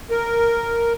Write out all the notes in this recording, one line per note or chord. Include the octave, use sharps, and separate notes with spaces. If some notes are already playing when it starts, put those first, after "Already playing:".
A#4